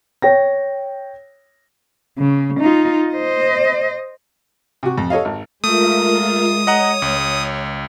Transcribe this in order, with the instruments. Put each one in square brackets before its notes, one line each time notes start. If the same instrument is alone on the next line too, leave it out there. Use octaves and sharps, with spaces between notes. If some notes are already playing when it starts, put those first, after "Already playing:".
[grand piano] C#5 G5 A#6
[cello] C#3
D#4 F4
C5 D#5
[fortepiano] C3 F#4
F2
A4 C#5 D#5 F5
G#1
[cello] G#3 [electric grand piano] A3 [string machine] F4 A#4 E5 [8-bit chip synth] D#6
[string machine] C#5 [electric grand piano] D#5 F#5 A#5
[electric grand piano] C#2